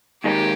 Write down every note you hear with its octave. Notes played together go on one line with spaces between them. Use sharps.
D#2 D#3 G#3 D#4 G4